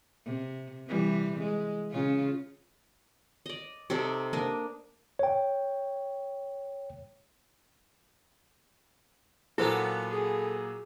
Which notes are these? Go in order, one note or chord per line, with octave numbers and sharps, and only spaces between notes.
C3
C3 E3 G3
G#3
C#3 C#4 F4
D5 D#5
C3 D#4 A4 D5
A#3 D4 D#5
C#5 G5
A#2 F#3 A#3 B3 E4 A4 C5
G#4